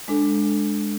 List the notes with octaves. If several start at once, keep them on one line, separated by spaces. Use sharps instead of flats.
G#3 D4 A4